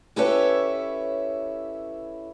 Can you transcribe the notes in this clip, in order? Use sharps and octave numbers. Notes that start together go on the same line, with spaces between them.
C#4 E4 G4 A4 B4 C#5